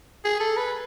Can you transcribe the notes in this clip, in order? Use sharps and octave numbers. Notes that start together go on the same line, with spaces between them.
G#4
A4
B4